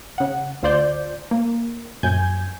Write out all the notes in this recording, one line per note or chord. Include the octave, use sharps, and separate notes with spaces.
C#3 F#5
D2 F4 C5 D5 G6
A#3
A#1 F#2 G#5 G6 G#6